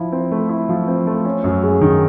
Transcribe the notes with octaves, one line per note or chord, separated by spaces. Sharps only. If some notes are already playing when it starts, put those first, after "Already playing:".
Already playing: F3 E4
C4
A3
E4
F3
C4
A3
C#4
F#2
G#3
D#3